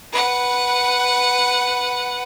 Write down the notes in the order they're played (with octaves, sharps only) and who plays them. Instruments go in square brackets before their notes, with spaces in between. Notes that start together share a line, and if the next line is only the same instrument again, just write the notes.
[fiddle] B4 F#5